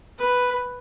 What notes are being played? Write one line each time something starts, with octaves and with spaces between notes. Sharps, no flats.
B4